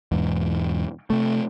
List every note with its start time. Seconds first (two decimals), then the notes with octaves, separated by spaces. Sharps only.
0.12 E1 E2 G#2
1.10 C3 A3